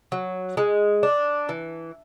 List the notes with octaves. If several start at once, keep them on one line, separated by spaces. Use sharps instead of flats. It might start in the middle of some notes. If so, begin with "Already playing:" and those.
F#3
G#3
D4
E3